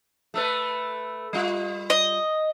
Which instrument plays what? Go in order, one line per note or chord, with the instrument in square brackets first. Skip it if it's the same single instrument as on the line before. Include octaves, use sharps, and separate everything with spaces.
[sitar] A3 A4 B4
G3 F4
[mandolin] D#5